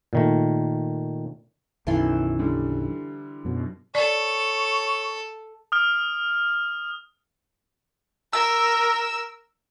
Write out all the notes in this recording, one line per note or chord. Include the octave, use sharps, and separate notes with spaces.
A#2 D#3 A3
B1 F#2 D#3 E3 A4 C6
D3 G3
F#2 B2
A4 C#5 D5
D#6 F6
A#4 E6